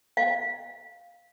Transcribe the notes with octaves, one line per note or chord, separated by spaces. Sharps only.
F5